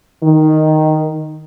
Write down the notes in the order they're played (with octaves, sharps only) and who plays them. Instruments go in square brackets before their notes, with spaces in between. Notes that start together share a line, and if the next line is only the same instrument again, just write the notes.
[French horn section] D#3